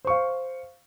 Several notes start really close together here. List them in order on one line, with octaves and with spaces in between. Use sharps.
C5 C#6 F5